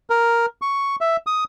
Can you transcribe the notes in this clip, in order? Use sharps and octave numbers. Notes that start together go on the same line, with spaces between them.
A#4
C#6
E5
D#6